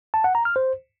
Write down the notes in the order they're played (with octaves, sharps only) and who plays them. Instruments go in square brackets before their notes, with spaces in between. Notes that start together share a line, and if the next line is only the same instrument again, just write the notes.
[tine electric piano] A5
F#5
A#5
F6
C5